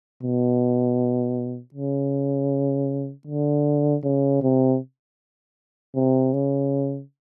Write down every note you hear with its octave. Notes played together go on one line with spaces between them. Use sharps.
B2
C#3
D3
C#3
C3
C3
C#3